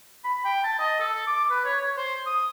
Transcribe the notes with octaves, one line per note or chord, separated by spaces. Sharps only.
B5
G5
A5
D#5
A4
D6
B4
C#5
C#5
C5
D#6